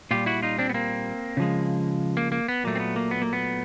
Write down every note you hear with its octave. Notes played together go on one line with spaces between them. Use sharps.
A#2 G3 F4 G4
E4 F#4
D#4 F4
C4 D4
B3
A#3 C4
C#3 F3 G#3
A#3
A#3
B3
A#2 F#3 A3 A#3
C4
B3
A#3
B3
A#3
B3